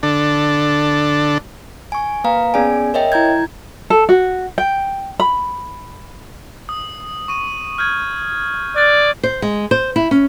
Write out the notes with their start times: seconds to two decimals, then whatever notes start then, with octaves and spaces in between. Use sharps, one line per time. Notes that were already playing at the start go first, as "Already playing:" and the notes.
0.03 D3 D4 A4
1.92 G#5 C#6
2.24 A#3 B4 F5 A#5
2.54 B3 C#4 G#4 D5 G#5
2.94 A#4 C#5 D#5 E5 G5
3.12 E4 A#5 G6 G#6
3.90 A4
4.09 F#4
4.58 G5
5.20 B5
6.69 D#6
7.28 C#6 D#7
7.78 F6 G6 G#6
8.76 D5 F6 F#6 A6
9.23 C5
9.42 G#3
9.71 C5
9.96 E4
10.11 C#4